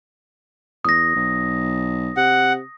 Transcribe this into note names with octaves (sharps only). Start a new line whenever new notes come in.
E2 D#6 A#6
B1
C3 F#5